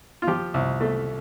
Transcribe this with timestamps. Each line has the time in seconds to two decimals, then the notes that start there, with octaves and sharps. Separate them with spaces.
0.22 F4
0.27 F3 G4
0.54 C2
0.81 A3